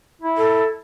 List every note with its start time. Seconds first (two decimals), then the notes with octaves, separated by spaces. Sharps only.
0.22 E4
0.37 A4